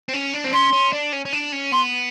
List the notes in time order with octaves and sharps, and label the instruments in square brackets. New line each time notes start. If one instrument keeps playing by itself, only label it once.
[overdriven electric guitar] C4
C#4
D4
C4
[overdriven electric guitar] C#4 [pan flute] C6
[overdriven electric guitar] C#4
D4
C#4
C#4
D4
C#4
[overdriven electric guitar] B3 [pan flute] C6